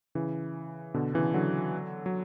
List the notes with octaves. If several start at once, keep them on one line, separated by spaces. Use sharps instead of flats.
C#3 E3
B2 D3
C#3 E3
D3 F#3
F#3